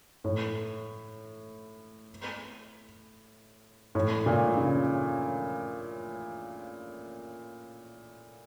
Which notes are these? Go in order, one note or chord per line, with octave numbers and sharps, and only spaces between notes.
A2
A2
A#2
C#3